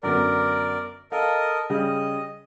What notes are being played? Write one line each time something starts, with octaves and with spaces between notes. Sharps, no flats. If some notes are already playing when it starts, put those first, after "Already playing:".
F#2 D3 B3 A#4 D5
A4 A#4 D#5 F5
C#3 G3 D#5